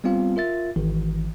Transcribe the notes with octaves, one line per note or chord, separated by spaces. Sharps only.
G3 B3 C4 F4 F5
F4 A#4 E5 A6
G#1 D#3 E3